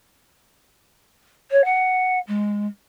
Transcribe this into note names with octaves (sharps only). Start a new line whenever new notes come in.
C#5
F#5
G#3